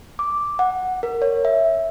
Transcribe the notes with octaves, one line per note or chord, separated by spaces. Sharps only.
D6
F#5
A#4
C#5
E5